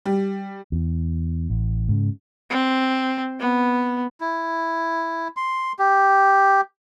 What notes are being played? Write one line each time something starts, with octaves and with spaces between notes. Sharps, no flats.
G3
E2
A1
G#2 C#3
C4
B3
E4
C6
G4